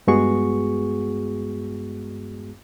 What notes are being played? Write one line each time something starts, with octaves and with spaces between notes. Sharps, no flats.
G2 G#3 B3 F#4 G#4 C#6